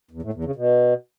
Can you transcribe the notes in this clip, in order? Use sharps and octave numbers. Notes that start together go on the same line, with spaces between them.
E2
A2
E2
C#3
B2